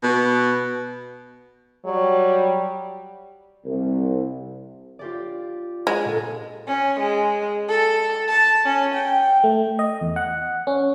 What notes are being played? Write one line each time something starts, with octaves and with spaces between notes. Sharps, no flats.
B2
F#3 G3
C2
F4 G4 D5
G#3
A#2 A4
C#4
G#3
A4
A5
C#4
G5
A3
D#5
E2
F#5
C#4